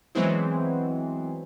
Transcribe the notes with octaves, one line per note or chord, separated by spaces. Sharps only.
E3 F#3 G#3 B3 C4 E4